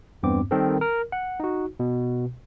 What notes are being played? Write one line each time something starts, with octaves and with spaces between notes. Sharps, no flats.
E2 G2 B3 C4 D6
D#3 G3 C4 A4 A#4
A#4
F#5
D#4 F#4
B2